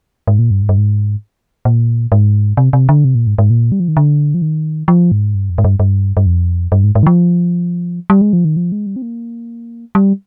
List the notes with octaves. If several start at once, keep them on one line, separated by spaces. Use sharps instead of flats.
G#2
A#2
G2
G#2
G2
G#2
A#2
G#2
C3
C3
D3
C3
A#2
G#2
G#2
A#2
G3
F3
D#3
D3
F3
D#3
F3
G#2
G2
F2
G#2
G2
G2
G2
F2
G2
G#2
G#2
D#3
F3
G3
G#3
F3
D#3
F3
G#3
G3
C4
A#3
G3